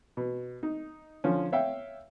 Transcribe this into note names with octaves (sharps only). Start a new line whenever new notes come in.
B2
D#4
D3 F3 C#4
C#5 E5 F5 G5